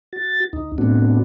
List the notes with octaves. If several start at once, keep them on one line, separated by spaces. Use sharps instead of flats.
F#4 A6
D2 D#4
A2 A3 B3 C4 D4 F#4